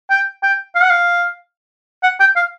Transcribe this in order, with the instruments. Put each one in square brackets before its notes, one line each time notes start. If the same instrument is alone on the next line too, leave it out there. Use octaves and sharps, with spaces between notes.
[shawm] G5
G5
F5
F#5
F5
F#5
G5
F5